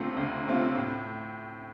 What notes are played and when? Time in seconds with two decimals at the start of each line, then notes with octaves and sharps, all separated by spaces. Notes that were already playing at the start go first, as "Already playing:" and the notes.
Already playing: D2 C3 A3 C4 F4
0.17 D2
0.46 C3 A3 C4 F4
0.75 A2